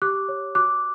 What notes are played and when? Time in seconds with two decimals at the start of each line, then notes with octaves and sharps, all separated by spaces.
0.02 G4 D6 F#6
0.29 C#5
0.55 F#4 D6 F#6